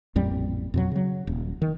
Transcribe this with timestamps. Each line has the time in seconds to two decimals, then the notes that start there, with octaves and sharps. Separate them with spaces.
0.16 A1 F2 A#2 G3
0.74 F2 B2 F#3
0.91 C#3 F#3
1.27 D#1
1.62 D#3